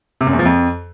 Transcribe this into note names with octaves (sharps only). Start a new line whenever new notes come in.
C3
F#2
E2
F3
F2